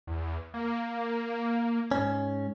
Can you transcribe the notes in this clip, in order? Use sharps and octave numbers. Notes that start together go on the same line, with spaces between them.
E2
A#3
G#2 C#4